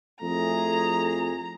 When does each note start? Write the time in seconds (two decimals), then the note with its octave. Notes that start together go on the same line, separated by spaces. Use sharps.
0.22 F2 A3 E4 G#4 A#5